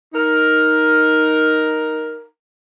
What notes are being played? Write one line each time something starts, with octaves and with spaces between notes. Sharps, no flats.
D#4 A#4